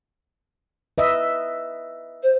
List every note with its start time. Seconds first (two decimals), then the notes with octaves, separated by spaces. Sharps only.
0.98 B4 D#5 E5
2.23 C5